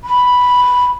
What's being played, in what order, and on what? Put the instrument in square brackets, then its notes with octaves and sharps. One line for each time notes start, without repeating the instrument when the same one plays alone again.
[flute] B5